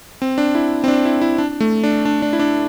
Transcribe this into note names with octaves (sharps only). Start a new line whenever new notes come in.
C4
D4
E4
C4
D4
E4
E4
D4
A3
D4
D4
D4
E4
D4